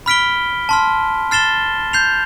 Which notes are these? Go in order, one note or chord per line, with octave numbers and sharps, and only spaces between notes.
B5 F6 B6 D7 G7
A5 C6 F6
F6 A6 C7 E7 G7
G6 C7 F7